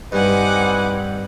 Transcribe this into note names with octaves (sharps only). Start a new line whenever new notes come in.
G2 C4 D#4 B4 F#5 G#5 D6